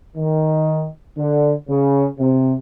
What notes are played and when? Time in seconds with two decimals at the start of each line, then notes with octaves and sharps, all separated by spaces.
0.17 D#3
1.18 D3
1.69 C#3
2.19 C3